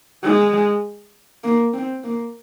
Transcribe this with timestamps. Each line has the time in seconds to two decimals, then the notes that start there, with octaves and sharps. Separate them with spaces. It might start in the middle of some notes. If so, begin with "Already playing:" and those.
0.24 G#3
1.44 A#3
1.74 C4
2.04 A#3